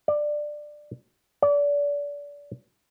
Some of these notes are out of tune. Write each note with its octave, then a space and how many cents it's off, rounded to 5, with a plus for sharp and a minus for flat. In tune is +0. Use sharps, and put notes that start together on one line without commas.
D5 +15
D5 -30